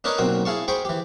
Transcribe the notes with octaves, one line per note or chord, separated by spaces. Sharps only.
D4 D#4 A#4 B4 C#5 D#5
B1 A#2 C4 F#4 A#4
E4 G#4 F5 A5 C#6
G#4 C5 G5 B5 C#6
E3 G4